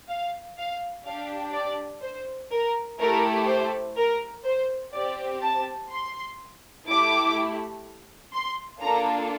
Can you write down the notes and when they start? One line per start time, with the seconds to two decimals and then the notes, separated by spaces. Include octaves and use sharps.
0.09 F5
0.58 F5
1.06 D4 G4 F5
1.54 D5
2.03 C5
2.52 A#4
3.00 A3 E4 G4 A#4
3.48 C5
3.97 A#4
4.45 C5
4.95 C4 G4 D5
5.43 A5
5.91 C6
6.88 A3 E4 G4 D6
8.33 C6
8.82 A#3 D4 F4 A4 A#5